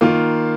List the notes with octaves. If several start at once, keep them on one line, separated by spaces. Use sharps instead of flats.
D#3 A#3 F4